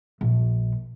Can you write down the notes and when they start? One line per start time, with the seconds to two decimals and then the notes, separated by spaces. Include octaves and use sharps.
0.21 A#1